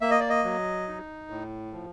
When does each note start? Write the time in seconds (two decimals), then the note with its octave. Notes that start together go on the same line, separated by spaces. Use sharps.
0.01 A#3 E5
0.11 D#5
0.20 D5
0.30 D#5
0.44 F#3
0.88 D#4
1.30 A2
1.73 F3